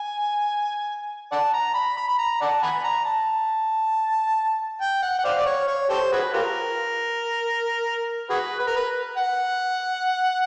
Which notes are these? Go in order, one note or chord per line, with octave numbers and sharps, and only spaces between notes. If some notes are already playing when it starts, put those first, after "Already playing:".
Already playing: G#5
D5 F#5 A5
A#5
B5
B5
B5
A#5
D5 F#5 A5
F#5 G#5 B5
A#5
A5
G5
F#5
F#5
C5 D5 F5
D5
C#5
C#5
G4 A4 C5
F#4 G#4 B4
F4 G4 A#4
F#4 G#4 B4
B4
A#4
B4
F#5